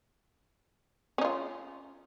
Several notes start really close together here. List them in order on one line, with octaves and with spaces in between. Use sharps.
C#4 D#4 F4